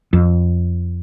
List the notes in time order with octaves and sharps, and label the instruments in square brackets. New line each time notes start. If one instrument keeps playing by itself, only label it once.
[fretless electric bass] F2